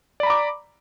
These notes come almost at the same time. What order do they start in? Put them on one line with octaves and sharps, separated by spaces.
D5 B5 A#5 D6